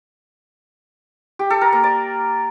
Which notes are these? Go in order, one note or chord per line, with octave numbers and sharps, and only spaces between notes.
G4
A4
A#4
A#3
D5